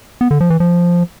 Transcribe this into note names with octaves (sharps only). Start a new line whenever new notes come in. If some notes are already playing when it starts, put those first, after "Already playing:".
B3
D3
F3
E3
F3